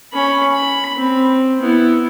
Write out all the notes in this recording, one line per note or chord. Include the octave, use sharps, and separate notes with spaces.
C#4 B5
B5
C4
B3 E4